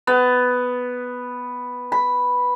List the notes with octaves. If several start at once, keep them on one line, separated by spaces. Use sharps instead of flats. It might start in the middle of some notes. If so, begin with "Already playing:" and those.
B3
B5